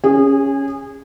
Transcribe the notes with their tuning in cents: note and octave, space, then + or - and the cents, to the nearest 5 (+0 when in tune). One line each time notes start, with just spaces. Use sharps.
C#4 +0 G#4 -25